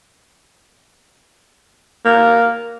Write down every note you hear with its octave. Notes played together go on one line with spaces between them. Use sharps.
A#3